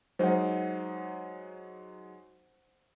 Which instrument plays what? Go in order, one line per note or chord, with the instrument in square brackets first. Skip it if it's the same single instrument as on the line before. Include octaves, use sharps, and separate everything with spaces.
[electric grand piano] F#3 G#3 D#4 [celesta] C5 F#5